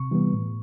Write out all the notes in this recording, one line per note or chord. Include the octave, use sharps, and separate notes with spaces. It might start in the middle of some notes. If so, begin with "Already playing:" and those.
Already playing: C3 C#6
E3 G3 B3
A2